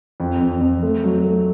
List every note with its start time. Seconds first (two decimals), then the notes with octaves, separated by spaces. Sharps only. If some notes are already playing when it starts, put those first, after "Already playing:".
0.20 F2
0.40 F2
0.61 F2
0.82 A3
1.04 F#3
1.24 A3